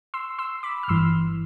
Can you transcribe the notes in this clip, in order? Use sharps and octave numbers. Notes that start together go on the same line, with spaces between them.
C6 E6
C6 E6
B5 D6
F6
G1 G2 E3 C6 E6